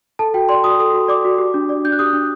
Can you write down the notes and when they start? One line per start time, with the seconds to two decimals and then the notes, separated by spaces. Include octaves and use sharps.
0.19 A4 A5
0.34 F#4 G5
0.49 D5 C6
0.64 F#4 D#6
0.79 A4 D#6
0.94 F#4
1.08 D5 D6
1.25 F#4
1.38 G4
1.54 D4
1.69 D5
1.84 D4 G6
1.92 F#6
1.99 G4 D#6
2.13 D4